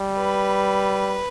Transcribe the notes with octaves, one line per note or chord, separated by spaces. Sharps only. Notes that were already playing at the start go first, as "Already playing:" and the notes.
Already playing: G3
B4